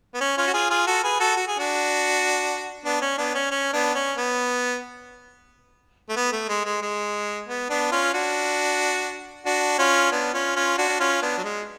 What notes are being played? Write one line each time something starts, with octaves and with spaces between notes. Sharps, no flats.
B3
C#4
C#4 F4
F#4
F4 G#4
F4 G#4
F#4 A4
G#4 B4
F#4 A4
F#4
G#4
D4 F#4
B3 D4
C#4
B3 D4
C#4
C#4
B3 D4
C#4
B3
A3
B3
A3
G#3
G#3
G#3
B3
B3 D4
C#4 F4
D4 F#4
D4 F#4
C#4 F4
B3 D4
C#4 F4
C#4 F4
D4 F#4
D4
C#4 F4
B3 D4
F#3
G#3